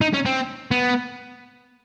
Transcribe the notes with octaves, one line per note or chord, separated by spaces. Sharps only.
D#4
C#4
C4
B3